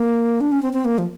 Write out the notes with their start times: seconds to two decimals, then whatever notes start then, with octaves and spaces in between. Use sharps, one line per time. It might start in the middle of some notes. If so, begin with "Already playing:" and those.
Already playing: A#3
0.41 D4
0.52 C#4
0.62 C4
0.73 C4
0.85 A#3
0.98 F3